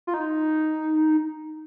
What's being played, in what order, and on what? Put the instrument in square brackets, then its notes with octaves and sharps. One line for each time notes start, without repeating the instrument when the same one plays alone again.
[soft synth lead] F4
D#4